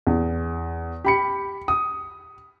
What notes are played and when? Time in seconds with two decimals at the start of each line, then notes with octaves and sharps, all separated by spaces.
0.07 E2
1.05 G4 B5 C#7
1.68 D#6